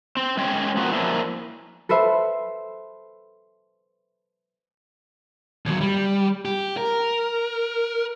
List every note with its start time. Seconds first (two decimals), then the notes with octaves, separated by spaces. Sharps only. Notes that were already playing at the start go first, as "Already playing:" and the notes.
0.17 C4
0.37 G#3 C4 C#4 C#5 G5
0.77 F3 A#3 B3 F4 F#4
0.92 F3 F#3 A#3 D4 E4
1.89 A4 B4 C5 E5
5.66 D#2 F#3
5.81 G3
6.45 G4
6.77 A#4